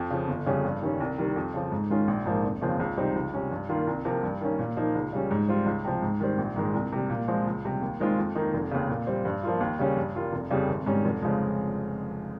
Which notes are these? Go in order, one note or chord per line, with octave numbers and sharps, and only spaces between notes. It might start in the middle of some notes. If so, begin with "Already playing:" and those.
Already playing: F2
C#3 F3
G1
F2 C#3 G3 C#4
G2
D#3 G3 C#4
C2
C3 D#3 G3
F2
C#3 F3
G#2
D#3 G#3 C#4 F4
A#1
G#2 F3 A#3
F1
D#2 C#3 F3 C4
C#2
C3 G3 C4 D#4
C#2
C3 G3 C#4
G2
D#3 A#3 F4
C2
C3 F3 A#3
G2
D#3 A#3 C#4
A#2
F3 A#3 D#4
C#2
C#3 G3 C#4
G#2
G3 C4 F4
C#2
C3 F3
G#2
D#3 G3 C4
A#1
G#2 D#3 G#3
C2
C3 G3
A#2
F3 G#3 C4
C#2
C3 G3
D#2
D#3 G#3 C4 F4
F2
D#3 A#3 D#4
F1
D#2 C#3
A#2
G3 C4
G2
F3 A#3 F4
D#2
C#3 G3 C#4
G2
G3 A#3 F4
F1
F2 C#3 G3
G#1
G#2 G3 C#4
F1
C#3 F3 G#3